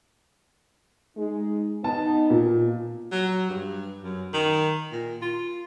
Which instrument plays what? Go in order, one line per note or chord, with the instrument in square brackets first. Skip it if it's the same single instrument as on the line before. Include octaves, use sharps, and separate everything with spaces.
[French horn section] G#3 D#4
[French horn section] B3 D#4 [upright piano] A5
[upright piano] A#2
[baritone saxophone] F#3
G2
F#2
D#3
A#2
F4